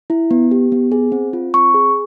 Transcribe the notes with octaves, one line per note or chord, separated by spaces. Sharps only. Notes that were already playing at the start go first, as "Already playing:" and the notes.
E4
B3
G4
B3
G#4
C4
F4
C4 C#6
G#4